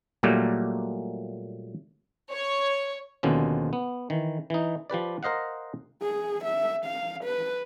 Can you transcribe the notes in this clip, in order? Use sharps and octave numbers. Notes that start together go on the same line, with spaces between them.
A#2 F#3 G3 A3 A#3
C#5
D#2 B2 D3 F3 C4 C#4
B3
D#3 E3
E3 D#4
F3 G4 B4 D5
A#4 C5 D#5 F5 F#5
G#4
E5
F5
B4